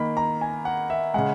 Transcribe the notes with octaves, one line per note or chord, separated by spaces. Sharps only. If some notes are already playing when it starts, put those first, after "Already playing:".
Already playing: D#3 A#3 B5
A#5
G#5
F#5
E5
C#3 G#3 F#5